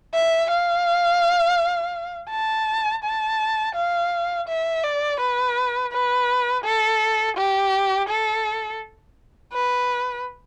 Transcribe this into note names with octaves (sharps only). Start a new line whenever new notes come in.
E5
F5
A5
A5
F5
E5
D5
B4
B4
A4
G4
A4
B4